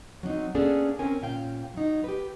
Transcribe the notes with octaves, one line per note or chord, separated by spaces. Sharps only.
F#3 C4 C#4 D#4
A#3 B3 C#4 D4 G#4 A4
C4 C#4 A#4 G#5
A#2 C#4 F5 G5
F#3 D#4
G4 B4